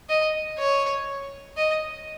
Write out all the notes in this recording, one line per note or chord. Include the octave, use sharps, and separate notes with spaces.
D#5
C#5
D#5